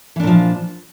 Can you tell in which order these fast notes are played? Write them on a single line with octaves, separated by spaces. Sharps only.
E3 D4 A#2 F3